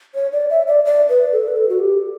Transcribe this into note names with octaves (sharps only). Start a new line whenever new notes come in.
C#5
D5
E5
D5
D5
B4
A4
B4
A4
F#4
G4